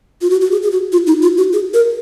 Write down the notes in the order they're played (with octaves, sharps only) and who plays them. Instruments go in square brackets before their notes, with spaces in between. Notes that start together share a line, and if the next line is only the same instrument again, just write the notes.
[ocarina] F4
F#4
F#4
G#4
G#4
F#4
F4
D#4
F4
F#4
G#4
A#4